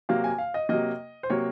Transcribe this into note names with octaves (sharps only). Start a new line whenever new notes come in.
C3 F#3 A#3 F5
G#5
F5
D#5
C3 F#3 A#3 D#5
C5
C3 F#3 A#3 C#5